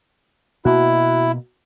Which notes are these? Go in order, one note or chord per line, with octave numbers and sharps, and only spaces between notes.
B2 A#3 E4 F#4